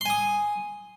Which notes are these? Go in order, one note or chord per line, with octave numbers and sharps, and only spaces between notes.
G#5 C6 D#6